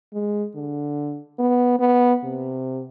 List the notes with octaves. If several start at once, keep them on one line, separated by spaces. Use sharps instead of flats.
G#3
D3
B3
B3
C3